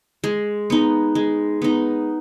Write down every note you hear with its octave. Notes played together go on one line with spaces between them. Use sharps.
G#3
B3 D#4
G#3
B3 D#4